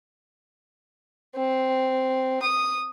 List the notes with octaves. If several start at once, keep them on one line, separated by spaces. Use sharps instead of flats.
C4
D#6